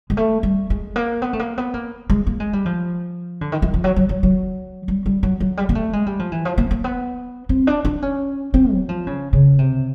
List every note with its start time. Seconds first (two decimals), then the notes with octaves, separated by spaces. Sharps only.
0.10 G#3
0.17 A3
0.43 G3
0.70 G#3
0.96 A#3
1.22 B3
1.33 A3
1.39 A#3
1.58 B3
1.74 A#3
2.10 G#3
2.27 A#3
2.40 G#3
2.53 G3
2.66 F3
3.41 D3
3.52 D#3
3.62 E3
3.74 F3
3.84 F#3
3.96 F#3
4.09 F#3
4.23 F#3
4.88 G3
5.06 G3
5.23 F#3
5.40 F#3
5.57 G3
5.69 A#3
5.75 A3
5.93 G#3
6.07 G3
6.19 F3
6.32 E3
6.45 F3
6.58 A#3
6.71 A#3
6.84 B3
7.49 C4
7.67 D4
7.85 D4
8.02 C#4
8.54 C4
8.72 F#3
8.89 F3
9.07 C#3
9.33 C#3
9.59 C3